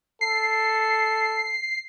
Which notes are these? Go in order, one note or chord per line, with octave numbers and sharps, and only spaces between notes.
A4 C7